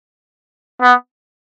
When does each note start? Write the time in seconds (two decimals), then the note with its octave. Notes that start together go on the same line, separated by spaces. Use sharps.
0.82 B3